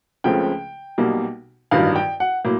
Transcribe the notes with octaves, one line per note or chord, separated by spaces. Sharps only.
C#2 C#3 F3 A3 C4 G5
B1 B2 G3 A#3
A1 G2 D#3 F#3 F5
G5
F#5
A2 F#3 A#3